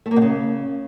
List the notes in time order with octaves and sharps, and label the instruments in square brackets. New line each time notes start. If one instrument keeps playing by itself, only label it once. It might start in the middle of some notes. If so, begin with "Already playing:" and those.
[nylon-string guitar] A3
A#3
B2
C#3